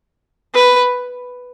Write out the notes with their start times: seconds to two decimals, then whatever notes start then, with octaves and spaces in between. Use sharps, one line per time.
0.54 B4